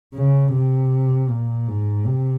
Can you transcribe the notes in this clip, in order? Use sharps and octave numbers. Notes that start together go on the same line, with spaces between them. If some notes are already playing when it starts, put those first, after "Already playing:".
C#3
C3
A#2
G#2
C3